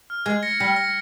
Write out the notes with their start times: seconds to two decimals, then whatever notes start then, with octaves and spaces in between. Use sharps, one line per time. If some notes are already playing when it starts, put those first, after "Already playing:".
0.10 F6
0.26 G#3 G#6
0.43 A#6 C#7
0.60 G3 A#6 C#7
0.76 A#6 C#7